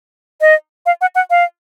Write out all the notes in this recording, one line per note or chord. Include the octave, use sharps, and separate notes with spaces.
D#5
F5
F#5
F#5
F5